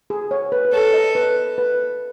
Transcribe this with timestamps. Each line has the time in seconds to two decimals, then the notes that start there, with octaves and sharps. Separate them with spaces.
0.10 G#4
0.31 C#5
0.52 B4
0.65 B4
0.73 A4 C#5
0.94 D#5
1.15 B4
1.58 B4